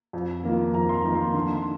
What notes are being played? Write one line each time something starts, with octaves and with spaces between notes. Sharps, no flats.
F2
D#3 A#3 F4
F2 A#5
C6
A#5
D#3 A#3 F4
C6
D3 C6
C6